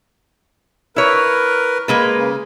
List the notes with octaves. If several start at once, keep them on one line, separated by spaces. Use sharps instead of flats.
E4 A#4 B4 C#5
G#3 A#3 B4
C#3